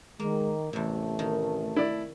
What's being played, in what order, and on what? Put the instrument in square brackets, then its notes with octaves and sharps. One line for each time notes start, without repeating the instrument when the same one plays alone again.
[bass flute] D#3 [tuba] G#3 [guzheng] A#3
[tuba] A1 [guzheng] E2 C3 [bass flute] A3
[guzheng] D#3
[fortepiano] E4 D5